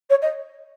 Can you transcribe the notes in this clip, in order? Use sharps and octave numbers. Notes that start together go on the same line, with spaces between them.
C#5
D#5